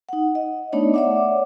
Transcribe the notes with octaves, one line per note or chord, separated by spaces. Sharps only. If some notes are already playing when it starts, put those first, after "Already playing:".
D#4 F#5
D#5
A3 B3 D4 D#4 C#5 D5
C#5 D5 E5 F#5 D6